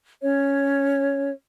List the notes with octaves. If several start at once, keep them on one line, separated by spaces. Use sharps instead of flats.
C#4 C#5